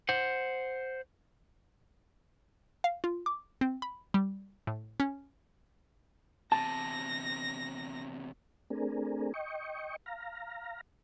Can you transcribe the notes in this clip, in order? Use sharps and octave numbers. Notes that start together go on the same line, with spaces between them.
C5 F#5
F5
F4
D6
C4
B5
G3
A2
C#4
E2 C3 A5 A#6
A3 C4 D4 G#4 A#4
D#5 G5 C#6
F5 A#5